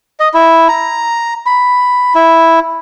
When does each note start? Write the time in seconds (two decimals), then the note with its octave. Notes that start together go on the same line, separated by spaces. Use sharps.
0.20 D#5
0.34 E4
0.69 A#5
1.46 B5
2.15 E4